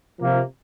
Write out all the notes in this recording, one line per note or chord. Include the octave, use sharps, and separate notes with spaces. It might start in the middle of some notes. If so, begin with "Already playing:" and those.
C3 F3 A#3